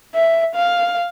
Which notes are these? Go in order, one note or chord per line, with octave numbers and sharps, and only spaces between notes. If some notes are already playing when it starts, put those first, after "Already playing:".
E5
F5